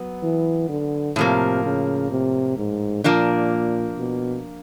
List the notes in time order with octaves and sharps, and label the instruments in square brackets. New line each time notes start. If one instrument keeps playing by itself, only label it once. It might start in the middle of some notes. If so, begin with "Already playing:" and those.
Already playing: [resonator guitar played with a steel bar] F#3 B3
[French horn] E3
D3
[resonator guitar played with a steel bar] A2 F3 A#3 [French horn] C3
[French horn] C#3
C3
G#2
[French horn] A#2 [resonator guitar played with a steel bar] F3 A#3 D4
[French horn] B2